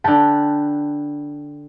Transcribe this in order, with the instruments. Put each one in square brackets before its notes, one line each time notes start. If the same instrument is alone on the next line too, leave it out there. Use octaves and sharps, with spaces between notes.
[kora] D3 B4 [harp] G5 A5